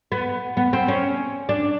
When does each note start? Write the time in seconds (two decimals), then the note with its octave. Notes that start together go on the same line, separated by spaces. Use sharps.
0.12 B3
0.57 B3
0.73 C4
0.88 C#4
1.49 D4